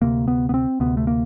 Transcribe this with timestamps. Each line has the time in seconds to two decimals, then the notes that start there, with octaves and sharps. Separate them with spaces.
0.02 D2 C3 A#3
0.28 B3
0.49 B3
0.54 C4
0.80 D2 C3 B3
0.97 A3
1.07 A#3